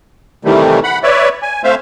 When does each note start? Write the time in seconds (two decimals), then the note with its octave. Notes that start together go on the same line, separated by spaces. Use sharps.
0.45 C3 D#3 E3 G3 A3
0.84 F#5 B5
1.03 B4 C#5 D5 E5
1.42 G#5
1.64 A3 C4 C5 E5 F5